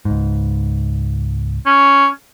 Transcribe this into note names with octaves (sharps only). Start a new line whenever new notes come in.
C#2 G#2
C#4